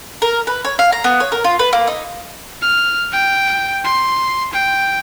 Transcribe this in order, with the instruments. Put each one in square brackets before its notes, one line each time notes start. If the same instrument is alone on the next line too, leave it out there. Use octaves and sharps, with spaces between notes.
[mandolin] A#4
B4
C#5
F5
A#5
B3
C#5
A#4
F4
B4
A#3
D#4
[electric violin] F6
G5
C6
G5